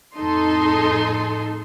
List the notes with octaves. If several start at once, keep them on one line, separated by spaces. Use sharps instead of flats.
F2 A2 D#4 A4 D#5 C6